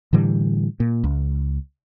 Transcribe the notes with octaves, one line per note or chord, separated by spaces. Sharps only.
A2 D3 E3 G3
A#2
C#2